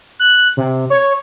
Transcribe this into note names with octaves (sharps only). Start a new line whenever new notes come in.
F#6
C3
C#5